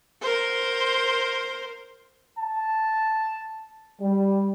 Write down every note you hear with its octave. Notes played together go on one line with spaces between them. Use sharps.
A#4 C5
A5
G3